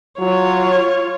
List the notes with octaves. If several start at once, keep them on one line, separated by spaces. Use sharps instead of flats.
F#3 F4 C#5